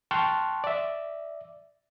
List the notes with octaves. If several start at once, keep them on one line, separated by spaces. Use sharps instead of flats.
G5 A5 C6 C#6 F6 F#6
D5 E5